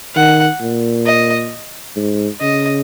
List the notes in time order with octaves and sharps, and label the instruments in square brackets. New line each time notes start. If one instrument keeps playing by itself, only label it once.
[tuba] D#3 [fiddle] F#5
[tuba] A#2
[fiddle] D#5
[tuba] G#2
[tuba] C#3 [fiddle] D#5